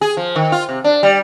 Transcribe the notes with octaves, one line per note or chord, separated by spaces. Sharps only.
G#4
F3
D#3
F4
C3
D4
G3